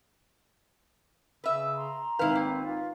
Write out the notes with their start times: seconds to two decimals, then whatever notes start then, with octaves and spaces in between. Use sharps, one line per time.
1.44 C#3 B4 E5 E6
1.75 A#5 C6
2.19 G#1 C4 E4 B4 F5
2.35 A#3
2.64 F4